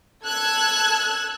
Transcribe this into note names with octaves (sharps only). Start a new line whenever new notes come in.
A4 E6 F#6 G#6